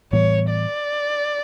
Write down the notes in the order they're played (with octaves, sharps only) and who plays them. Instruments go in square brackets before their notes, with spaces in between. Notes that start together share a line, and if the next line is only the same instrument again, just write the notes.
[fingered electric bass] A2 E3 G3 B3 [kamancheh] C#5
[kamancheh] D5